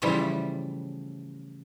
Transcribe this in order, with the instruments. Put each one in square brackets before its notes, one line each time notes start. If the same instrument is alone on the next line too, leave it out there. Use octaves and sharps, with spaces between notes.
[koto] A2 C#3 E3 F3 G3